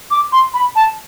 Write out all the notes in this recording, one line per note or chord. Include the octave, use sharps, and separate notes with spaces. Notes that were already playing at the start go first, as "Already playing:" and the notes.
D6
C6
B5
A5